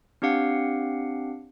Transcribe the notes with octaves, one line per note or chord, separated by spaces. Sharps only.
C4 D4 G4 F5 F#5